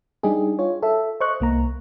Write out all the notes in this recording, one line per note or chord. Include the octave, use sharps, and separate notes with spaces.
G3 D4 D#4 G4 G#4
F4 C#5
A4 E5
C5 D#5 C#6 F#6
C2 A#3 A#5